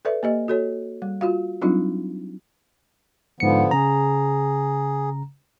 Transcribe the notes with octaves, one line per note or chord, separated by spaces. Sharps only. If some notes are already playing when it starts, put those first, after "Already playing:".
A4 B4 D5 E5
A#3 G4 D#5
F#4 A4 C#5
G3
F4 F#4 F5
F#3 G3 C4 D4 D#4 F4
G#2 D3 F3 B3 C#7
C#3 G#4 A#5